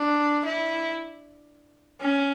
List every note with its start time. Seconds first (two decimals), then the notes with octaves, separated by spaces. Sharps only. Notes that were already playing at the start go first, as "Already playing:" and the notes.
Already playing: D4
0.45 E4
2.01 C#4